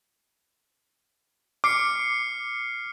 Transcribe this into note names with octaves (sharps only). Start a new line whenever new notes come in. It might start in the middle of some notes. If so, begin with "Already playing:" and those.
D6 F6 C7 C#7